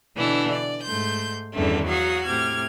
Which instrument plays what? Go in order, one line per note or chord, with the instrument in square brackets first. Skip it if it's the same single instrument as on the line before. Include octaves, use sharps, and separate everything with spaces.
[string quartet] B2 D3 E3 D4 E4
D5
G#2 A3 C6 G6
E2 G2 D3 D#3 A3 C#4
F#3 F#4 F5 C#6 D#6
A2 C3 D6 F6 G#6